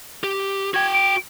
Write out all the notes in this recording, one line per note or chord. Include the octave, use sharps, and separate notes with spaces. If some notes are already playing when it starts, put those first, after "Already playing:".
G4
F#4 G5 G#6
D7